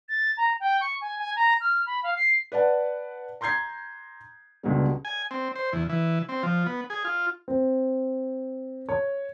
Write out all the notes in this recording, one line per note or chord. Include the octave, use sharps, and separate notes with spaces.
A6
A#5
G5
C#6
G#5
G#5
A#5
F6
B5
F5
C7
B4 D5 F#5 A5
A#5 C6 G6 G#6 C7
C#2 B2 D3 G3
G#5
C4
C5
E2
E3
C4
F3
B3
G#4
F4
C4
C#5